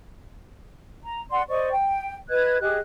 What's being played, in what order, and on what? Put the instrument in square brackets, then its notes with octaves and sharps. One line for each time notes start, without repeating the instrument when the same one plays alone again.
[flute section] A#5
D5 F#5 C6
C5 D5 D#5 C#6
G5
B4 D#5 F#6 G#6
G4 G#4 D#5 F#6